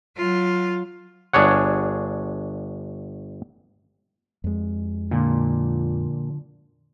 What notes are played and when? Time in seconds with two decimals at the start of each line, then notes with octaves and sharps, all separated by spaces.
0.17 F#3 F4
1.33 G1 D4 G#4 C#5 F#5
4.44 F2 G#3
5.11 A#2 D3 F3